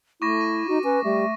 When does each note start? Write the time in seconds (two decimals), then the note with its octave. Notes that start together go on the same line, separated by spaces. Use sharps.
0.22 A3 E4 C#6 D6 A#6
0.41 D#7
0.68 D#4 F#4
0.84 C#4 B4
1.04 G3 A3